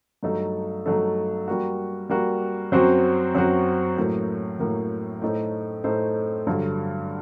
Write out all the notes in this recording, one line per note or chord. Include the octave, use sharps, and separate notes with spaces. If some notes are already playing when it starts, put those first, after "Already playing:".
G2 F#3 A3 D#4 A4
G2 F#3 A3 D#4 A4
G3 A#3 F#4
G3 A#3 F#4
F#2 F#3 C4 F#4 C5
F#2 F#3 C4 F#4 C5
A2 F#3 A#3
A2 F#3 A#3
A2 A3 D#4 A4 C5
A2 A3 D#4 A4 C5
G2 D3 F#3